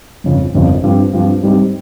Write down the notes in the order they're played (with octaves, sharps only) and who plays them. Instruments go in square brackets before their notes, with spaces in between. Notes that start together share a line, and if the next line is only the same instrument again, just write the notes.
[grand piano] G1 F2 C#3 F3
G1 F2 C#3 F3
G2 F3 C4
G2 F3 C4
G#2 G3 C4 G4